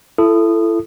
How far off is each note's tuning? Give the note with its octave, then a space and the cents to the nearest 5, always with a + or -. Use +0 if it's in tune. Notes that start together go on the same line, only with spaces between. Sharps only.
E4 +30 A4 +0 D#6 -20